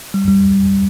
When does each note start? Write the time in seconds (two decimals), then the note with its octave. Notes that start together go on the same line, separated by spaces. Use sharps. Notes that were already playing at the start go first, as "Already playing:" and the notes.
0.14 G3
0.28 G3